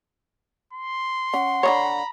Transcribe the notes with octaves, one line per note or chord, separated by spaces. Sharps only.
C6
C#4 F#5
D3 B3 C#5 A#5 B5